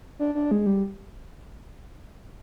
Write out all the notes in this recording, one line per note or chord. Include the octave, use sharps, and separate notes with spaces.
D4
D4
G#3
G3